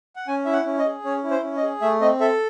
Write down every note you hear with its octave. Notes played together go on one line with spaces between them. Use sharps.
F#5
C#4 G#5
E4 E5
F#5
C#4
D#5
G#4
C#4 C#5
E4
C5
C#4
D#5
G#4
A3 E5
C4 D#5
A4 E5